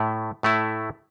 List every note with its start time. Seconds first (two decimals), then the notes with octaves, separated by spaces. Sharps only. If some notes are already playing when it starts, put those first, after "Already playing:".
Already playing: A2 A3 E4
0.43 A2 A3 E4